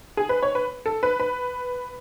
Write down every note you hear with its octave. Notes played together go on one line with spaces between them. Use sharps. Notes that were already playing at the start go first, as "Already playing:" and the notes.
G#4
B4
C#5
B4
A4
B4
B4